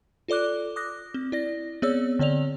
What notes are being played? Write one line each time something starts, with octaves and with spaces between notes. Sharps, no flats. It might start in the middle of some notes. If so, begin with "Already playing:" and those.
F4 A4 D5 D6 F#6
D6 D#6 F#6 A#6
C4
E4 D5 A#6
B3 C4 G#4 C#5 D5 E6
D3 C4 C#5 D5 F7